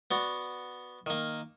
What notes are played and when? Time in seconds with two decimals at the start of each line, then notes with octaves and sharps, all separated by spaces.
0.11 B3 F#4 D5
1.06 D#3 A#3